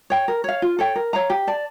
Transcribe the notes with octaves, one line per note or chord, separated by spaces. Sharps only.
C#5 G5
A#4
C#5 F5
F4
A4 C#5 G5
A#4
C#5 F5 A#5
G4
D5 A5